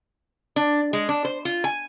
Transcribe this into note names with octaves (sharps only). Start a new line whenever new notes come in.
D4
G#3
D4
C5
F4
G#5